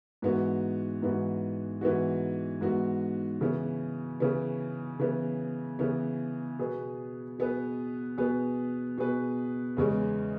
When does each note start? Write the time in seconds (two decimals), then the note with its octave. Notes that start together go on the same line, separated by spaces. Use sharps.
0.22 G#2 E3 B3 F#4
1.02 G#2 E3 B3 F#4
1.81 G#2 E3 B3 F#4
2.61 G#2 E3 B3 F#4
3.41 C#3 E3 B3
4.20 C#3 E3 B3
4.99 C#3 E3 B3
5.79 C#3 E3 B3
6.59 B2 B3 G#4 B4
7.39 B2 B3 G#4 B4
8.18 B2 B3 G#4 B4
8.98 B2 B3 G#4 B4
9.77 E2 C#3 G#3 C#4